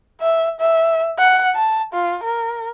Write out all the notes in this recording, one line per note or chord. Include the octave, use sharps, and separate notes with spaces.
E5
E5
F#5
A5
F4
A#4